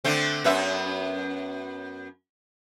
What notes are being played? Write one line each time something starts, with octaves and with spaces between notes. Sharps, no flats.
D3 A3 C4
F#2 B3 E5